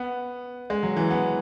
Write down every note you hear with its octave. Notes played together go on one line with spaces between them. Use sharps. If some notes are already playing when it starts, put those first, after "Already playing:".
Already playing: B3
G#3
F#3
E3
B3